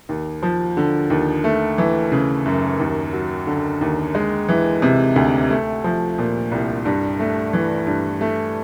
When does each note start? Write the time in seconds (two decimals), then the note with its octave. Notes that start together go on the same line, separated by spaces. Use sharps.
0.09 D#2
0.43 F3
0.77 D3
1.10 D#2
1.44 A3
1.78 E3
2.12 C#3
2.46 F#2
2.80 D#2
3.13 F#3
3.47 D3
3.81 D#2
4.15 G#3
4.49 E3
4.82 C3
5.16 D2
5.50 A3
5.84 F3
6.18 A#2
6.52 C2
6.85 G2
7.20 A3
7.53 E3
7.87 G2
8.21 A3